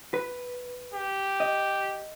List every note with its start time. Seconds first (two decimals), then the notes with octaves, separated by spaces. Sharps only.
0.14 B4
0.94 G4
1.40 D#5